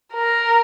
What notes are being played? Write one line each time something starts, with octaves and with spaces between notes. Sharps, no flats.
A#4